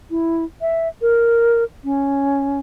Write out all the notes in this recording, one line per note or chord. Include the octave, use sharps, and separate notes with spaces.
E4
E5
A#4
C#4